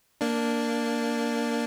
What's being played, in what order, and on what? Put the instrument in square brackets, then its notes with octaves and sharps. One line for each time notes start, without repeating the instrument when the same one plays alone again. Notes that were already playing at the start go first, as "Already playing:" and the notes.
[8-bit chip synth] A#3 D4